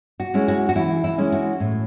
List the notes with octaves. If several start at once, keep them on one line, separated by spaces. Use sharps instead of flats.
F#4
G#3 C#4 E4
F#4
F#4
E3 E4
E4
G#3 C#4 E4
F#4
A2